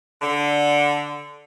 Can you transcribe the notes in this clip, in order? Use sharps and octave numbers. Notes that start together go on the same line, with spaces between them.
D3